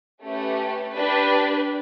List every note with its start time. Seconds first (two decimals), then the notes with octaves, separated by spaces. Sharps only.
0.22 A3 C#4 G4 B4
0.96 D4 G4 B4